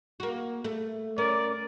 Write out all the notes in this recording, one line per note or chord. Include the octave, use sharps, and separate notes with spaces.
A#3 F#4
A3
C#4 A#4 D5